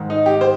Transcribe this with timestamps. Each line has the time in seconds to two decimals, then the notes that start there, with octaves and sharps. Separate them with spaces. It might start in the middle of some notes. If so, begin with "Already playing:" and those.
Already playing: G#2 D#3 G#3
0.10 D#4
0.26 G4
0.41 C5